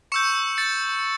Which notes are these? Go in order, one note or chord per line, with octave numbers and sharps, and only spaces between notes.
C#6 E6 G6 C#7 E7
A6 C#7